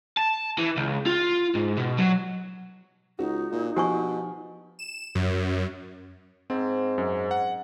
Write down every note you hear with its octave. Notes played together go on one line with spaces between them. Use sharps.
A5
E3
C#2
F4
G#2
B2
F#3
C#2 D#4 F#4
A#2
B2 F3 G4 G#5 C#6
E7
F#2
G#2 C4
F#2
F#5